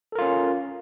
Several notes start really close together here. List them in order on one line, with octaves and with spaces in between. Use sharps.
A4 A#4 F4 C#4